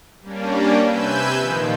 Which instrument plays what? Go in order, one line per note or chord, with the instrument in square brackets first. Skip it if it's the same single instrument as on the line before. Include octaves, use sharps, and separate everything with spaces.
[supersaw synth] G3 A#3 C#4 D4
C3 B4 G#5 E6 G6
A#2 D#3 F3